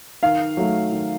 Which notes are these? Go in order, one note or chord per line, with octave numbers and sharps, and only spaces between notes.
D#3 F5
F#3 A3
D#3